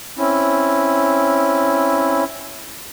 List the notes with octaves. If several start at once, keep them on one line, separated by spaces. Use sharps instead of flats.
C4 C#4 E4